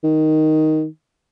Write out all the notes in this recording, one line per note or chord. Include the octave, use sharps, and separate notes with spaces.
D#3